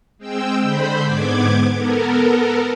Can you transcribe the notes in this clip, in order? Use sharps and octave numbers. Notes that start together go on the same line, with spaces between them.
G#3 C4 G5 E6
D3 C5 B5 G6
G#2 B3 D6 G#6
B3 A4 A#4